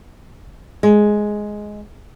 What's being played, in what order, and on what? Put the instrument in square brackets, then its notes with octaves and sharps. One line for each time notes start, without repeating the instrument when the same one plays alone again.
[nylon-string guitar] G#3